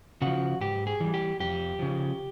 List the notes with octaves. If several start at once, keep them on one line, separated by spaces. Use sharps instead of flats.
C#3 F3 F#4
G#2 G4
G#4
E3 G3
G4
F2 G4
C#3 F3